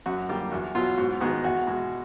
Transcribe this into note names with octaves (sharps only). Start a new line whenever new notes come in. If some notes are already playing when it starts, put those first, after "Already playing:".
F#2 F#4
D3 G3 A#3 G4
E2 F#4
B2 F#3 B3 F4
G#2 F#4
D#3 G#3 B3 D#4 F#4
E2 F#4
B2 G#3